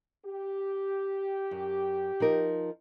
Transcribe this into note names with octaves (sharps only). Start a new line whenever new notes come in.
G4
F#2
F3 D#4 A#4